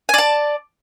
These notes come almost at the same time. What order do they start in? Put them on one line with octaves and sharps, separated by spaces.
G#5 D5 A5